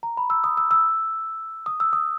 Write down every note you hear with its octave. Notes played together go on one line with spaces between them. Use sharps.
A#5
B5
E6
D#6
E6
E6
D#6
E6
D#6